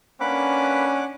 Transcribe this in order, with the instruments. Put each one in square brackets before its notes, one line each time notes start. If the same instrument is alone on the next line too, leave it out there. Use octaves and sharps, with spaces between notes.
[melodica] A#3 B4 B5 [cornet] C#4 [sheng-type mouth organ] D4 F#5 D6